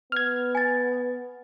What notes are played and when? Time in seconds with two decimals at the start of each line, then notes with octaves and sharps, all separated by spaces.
0.12 B3 F6 G#6
0.55 G#5 A6